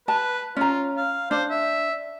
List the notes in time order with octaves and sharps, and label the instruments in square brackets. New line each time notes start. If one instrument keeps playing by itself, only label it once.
[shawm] B4 [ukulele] A5
[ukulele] C#4 A#5 [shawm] F4
[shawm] F5
[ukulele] D4 [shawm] C5
[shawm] E5